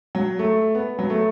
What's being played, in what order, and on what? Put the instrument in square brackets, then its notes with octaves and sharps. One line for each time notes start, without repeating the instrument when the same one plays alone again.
[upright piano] F#3
A3
B3
F#3
A3